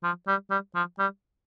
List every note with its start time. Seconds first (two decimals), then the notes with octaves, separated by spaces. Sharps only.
0.04 F3
0.27 G3
0.50 G3
0.75 F3
0.99 G3